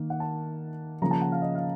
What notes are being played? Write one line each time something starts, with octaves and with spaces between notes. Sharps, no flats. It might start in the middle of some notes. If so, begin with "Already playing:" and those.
Already playing: D#3 A#3
F#5
A5
C#3 F3 A#3 A#5
A5
F#5
F5
D#5
F5